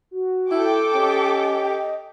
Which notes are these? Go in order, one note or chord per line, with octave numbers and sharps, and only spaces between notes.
F#4
E4 A4 G5 D6
C#4 G4 D#5